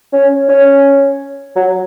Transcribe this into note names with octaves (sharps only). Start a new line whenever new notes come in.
C#4
C#4
F#3